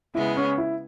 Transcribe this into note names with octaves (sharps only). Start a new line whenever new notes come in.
C#3 G#3 B3 E4 G#4
C#4
E4